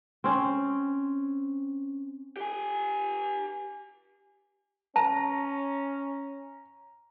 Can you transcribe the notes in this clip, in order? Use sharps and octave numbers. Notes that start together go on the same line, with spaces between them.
C4 C#4
G4 G#5
C#4 A5 A#5